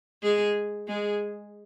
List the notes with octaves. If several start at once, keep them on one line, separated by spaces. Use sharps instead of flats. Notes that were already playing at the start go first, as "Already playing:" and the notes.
G#3 G#4
G#3 G#4